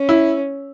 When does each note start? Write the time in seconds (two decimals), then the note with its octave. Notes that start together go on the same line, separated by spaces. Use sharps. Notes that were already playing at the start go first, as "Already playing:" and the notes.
Already playing: C#4
0.09 E4